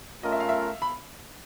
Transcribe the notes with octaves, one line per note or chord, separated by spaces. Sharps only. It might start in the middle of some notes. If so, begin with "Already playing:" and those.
A3 C#4 F4 A#4 D#5
E5
F5
E5
B5